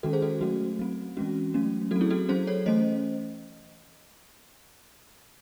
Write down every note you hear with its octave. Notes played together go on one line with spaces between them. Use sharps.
D#3 G#3 C#4 F#4 A4
G#4 C5
F#4 A4
F#3 A3 C#4 F#4
F#3 C4
E3 G#3 C#4 F#4
F#3 A3 C#4
F#3 C4 F#4 A4
E4 G#4
F#4 A4
F#3 C#4 G#4 C5
A4 C#5
E3 A3 C#4 C5 D#5